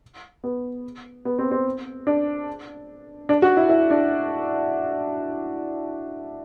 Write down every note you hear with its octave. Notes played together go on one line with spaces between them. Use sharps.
B3
B3
C4
C4
D4
D4
F#4
E4
E4
D4